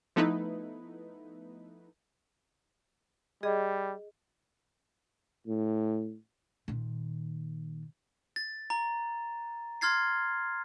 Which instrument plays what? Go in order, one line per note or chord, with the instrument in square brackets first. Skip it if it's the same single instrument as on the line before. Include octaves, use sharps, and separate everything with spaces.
[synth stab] F3 A3 B3 D#4 E4 B4
[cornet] G3 [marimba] G#4 D#5
[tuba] A2
[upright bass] A#2 D#3
[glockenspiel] A6
A#5
C6 F6 G#6 A6 C7